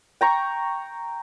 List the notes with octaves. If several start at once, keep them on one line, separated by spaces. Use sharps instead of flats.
G5 A#5 C#6